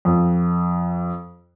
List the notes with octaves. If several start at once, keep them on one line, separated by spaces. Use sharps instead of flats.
F2